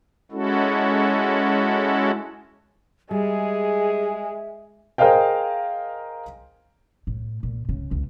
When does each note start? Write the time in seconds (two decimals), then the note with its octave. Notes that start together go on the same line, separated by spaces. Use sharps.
0.32 G#3 C#4 E4 F#4 A4
3.11 G3 G#3 G#4 E5
4.98 G#4 A#4 C5 D#5 F5 G5
7.07 A2
7.43 A#2
7.69 C#3
7.91 C#2